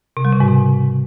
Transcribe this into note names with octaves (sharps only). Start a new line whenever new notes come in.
C3
G3
C#3
G#2
C3